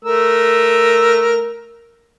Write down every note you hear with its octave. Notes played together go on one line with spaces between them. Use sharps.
A3 A#4 E6